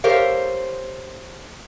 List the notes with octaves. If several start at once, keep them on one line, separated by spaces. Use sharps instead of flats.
G4 A4 A#4 C5 C#5 F5